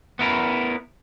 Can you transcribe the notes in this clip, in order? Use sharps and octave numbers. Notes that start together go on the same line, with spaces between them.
B3 E4 A#4